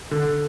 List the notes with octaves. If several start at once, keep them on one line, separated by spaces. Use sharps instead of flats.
D3